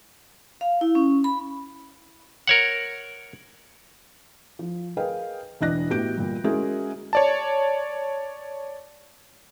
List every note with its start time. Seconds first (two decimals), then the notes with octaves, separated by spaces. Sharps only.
0.61 F5
0.81 E4
0.95 C#4
1.24 B5
2.47 A#4 C#5 F#5
4.59 F3
4.97 G#4 A#4 B4 D#5 F5 G5
5.61 E1 E3 D4 D#5 F#6 A#6
5.90 A2 B3 F#4 G4 G6 D7
6.18 A#2 G3
6.44 G#3 C#4 E4 F#4 G#4 A#4
7.13 C#5 D5 A5